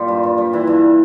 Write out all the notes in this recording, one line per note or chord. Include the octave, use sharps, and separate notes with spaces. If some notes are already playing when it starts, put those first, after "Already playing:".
Already playing: A#2 G3 F4
G2
G2
G3
E3 E4
G2